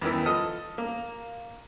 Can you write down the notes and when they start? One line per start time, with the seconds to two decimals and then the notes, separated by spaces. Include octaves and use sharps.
0.02 E2 D#3 E3
0.26 F3 A4 D#5 F6
0.78 A#3